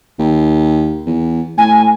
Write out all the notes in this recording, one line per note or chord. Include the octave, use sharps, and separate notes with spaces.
D#2
E2
A2 G#5